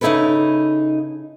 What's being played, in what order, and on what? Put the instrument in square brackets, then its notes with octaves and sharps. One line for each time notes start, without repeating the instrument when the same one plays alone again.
[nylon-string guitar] C#3 D#4 E4 G4 A4 B4